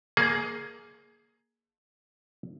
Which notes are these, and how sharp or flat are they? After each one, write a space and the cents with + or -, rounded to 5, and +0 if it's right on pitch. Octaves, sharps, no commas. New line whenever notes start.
A#3 +0 G#4 +15